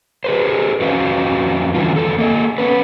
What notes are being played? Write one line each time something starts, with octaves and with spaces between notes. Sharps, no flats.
G#4 B4 C5
F2 C#4 F#4 B4 D#5 F5
D3 E3 G3 F4
E2 C#3 A4
A#3 A4 D#5
B3 C#4 B4